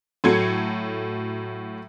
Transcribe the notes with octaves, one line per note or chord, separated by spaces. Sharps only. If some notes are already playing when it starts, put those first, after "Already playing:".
A2 F#3 A4 G#6 C7 C#7